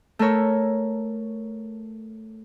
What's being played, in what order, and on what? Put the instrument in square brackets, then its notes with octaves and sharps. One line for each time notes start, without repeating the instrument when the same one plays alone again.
[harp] A3 A4 A#4 C#5